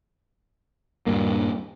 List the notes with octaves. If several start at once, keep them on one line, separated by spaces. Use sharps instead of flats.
D#1 G2 A#3